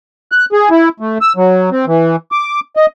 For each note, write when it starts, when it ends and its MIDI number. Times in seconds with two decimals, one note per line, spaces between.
0.32 0.45 90
0.52 0.69 68
0.70 0.89 64
1.00 1.18 57
1.21 1.33 88
1.36 1.70 54
1.71 1.85 60
1.87 2.16 52
2.32 2.60 86
2.77 2.86 75